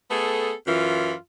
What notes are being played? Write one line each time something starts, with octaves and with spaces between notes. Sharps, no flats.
A3 B3 G#4 A4
F#2 E3 F4